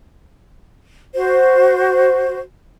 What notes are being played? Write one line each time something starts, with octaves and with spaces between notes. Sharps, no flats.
F#4 C5